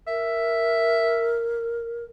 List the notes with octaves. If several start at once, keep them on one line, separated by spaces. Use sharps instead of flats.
A#4 E5